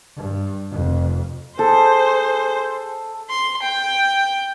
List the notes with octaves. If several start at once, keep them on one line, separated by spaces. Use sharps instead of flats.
G2
F1 F2
G#4 A4 C5
C6
G5